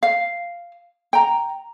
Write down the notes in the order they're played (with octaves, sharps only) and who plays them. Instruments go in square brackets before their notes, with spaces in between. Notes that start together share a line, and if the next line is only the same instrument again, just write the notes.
[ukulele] F5
G5 A#5